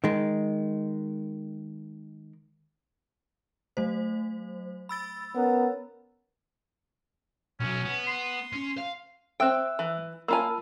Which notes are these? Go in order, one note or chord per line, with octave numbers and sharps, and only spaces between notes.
D#3 G#3
F#3 A3 C5
B5 E6 A6
B3 C#4 A#4
B1 F#3 C#4
B3
C6
C#4
F5
C4 E5 G5 E6 F#6
E3
A#3 F4 G#5 A5 B5 E6